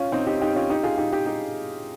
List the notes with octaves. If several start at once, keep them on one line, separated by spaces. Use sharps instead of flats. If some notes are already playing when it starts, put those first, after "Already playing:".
Already playing: C#4 F4
C4 D#4
D#4 G4
D#4 G4
C#4 F4
D#4 G4
F4 G#4
D#4 G4
D#4 G4
D#4 G4